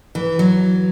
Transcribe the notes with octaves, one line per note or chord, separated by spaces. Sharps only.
E3
F#3